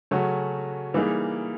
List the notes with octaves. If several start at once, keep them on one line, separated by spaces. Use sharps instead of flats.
C#3 F#3 A3 C#4 F#4
E3 G3 A#3 D#4 G#4